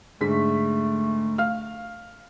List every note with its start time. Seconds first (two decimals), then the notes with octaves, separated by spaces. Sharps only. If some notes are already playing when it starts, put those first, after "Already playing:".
0.21 G#2 D3 A3 B6
1.38 F5 F6